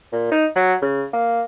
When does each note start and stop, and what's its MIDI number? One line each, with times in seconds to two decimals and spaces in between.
0.13 0.31 46
0.32 0.46 63
0.56 0.74 54
0.82 1.05 49
1.13 1.43 58